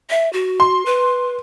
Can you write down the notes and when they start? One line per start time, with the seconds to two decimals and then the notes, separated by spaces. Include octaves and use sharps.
0.10 E5
0.33 F#4
0.60 C6
0.86 B4